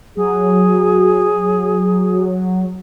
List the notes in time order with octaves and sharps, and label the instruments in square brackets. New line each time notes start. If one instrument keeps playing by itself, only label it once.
[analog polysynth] F#3 [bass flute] G#4